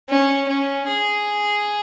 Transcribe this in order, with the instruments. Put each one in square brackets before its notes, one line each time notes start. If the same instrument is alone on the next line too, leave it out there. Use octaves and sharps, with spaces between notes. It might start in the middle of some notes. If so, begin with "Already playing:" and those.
[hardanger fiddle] C#4
C#4
G#4